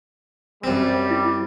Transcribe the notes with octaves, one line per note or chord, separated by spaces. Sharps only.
F#2 G3 C4
E4